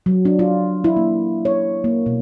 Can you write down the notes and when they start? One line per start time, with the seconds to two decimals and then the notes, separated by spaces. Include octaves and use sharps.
0.06 F#3
0.25 D4
0.39 F4
0.84 E4
0.97 A#3
1.45 C#5
1.84 A#3
2.06 B2